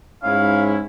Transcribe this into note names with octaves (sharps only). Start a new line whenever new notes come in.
G#2 C#4 E4 F5